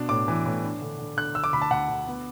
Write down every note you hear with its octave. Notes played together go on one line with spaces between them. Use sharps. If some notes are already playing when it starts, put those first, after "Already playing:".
Already playing: B2 D4
A2 D6
E3
A2
D4
D3
D3
D3 F#6
D3 E6
D6
D2 B5
A5
D2 F#5
D3
B3